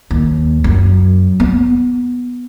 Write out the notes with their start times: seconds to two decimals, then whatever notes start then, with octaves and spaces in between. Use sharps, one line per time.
0.11 D#2
0.64 F#2
1.40 B3